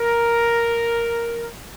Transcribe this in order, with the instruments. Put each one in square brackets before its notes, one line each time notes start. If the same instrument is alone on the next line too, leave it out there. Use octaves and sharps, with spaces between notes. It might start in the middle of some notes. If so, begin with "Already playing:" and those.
Already playing: [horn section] A#4